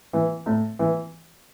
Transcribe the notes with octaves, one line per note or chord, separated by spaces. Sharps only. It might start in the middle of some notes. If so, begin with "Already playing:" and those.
E3
A2
E3